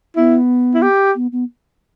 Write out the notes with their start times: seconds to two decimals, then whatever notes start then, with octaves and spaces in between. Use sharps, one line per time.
0.16 B3 E4
0.74 E4
0.83 G4
1.15 B3
1.32 B3